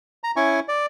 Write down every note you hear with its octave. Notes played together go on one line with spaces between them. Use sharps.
A#5
C#4 E4 G#5 C#6
D5